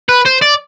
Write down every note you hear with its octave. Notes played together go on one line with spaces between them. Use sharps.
B4
C5
D5